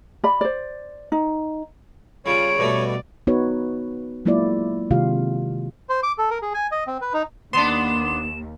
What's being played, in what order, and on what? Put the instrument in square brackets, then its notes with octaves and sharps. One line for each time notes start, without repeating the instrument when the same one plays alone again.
[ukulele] D5 B5
C5 D5
D#4
[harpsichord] C#3 G3 [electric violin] F4 D7 [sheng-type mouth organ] C#5
[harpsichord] G2 B2 A3 [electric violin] D5
[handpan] B3 D#4 F#4 B4 C#5
F#3 G#3 A#3 E4 F4 D5
C3 D#3 G#3 F4 G4 F5
[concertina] C5
D6
A4
A#4
G#4
G#5
D#5
C4
B4
D#4
[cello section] D#2 [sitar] B3 D4 [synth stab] C6 [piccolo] E7